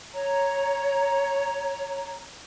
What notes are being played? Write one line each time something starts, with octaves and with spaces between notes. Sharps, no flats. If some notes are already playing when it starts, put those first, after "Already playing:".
C#5 A#5